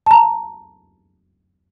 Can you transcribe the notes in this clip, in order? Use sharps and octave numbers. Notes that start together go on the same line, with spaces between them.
A5 A#5